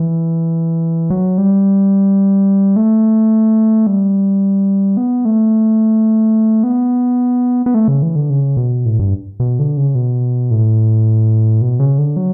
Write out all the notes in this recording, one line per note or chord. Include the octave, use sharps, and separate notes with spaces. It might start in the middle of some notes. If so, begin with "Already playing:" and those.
Already playing: E3
F#3
G3
A3
G3
B3
A3
B3
B3
A3
C#3
E3
D3
C#3
B2
A2
G2
B2
D3
C#3
B2
A2
B2
C#3
D3
F#3